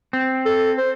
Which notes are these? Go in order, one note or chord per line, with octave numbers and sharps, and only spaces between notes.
C4
A4
C5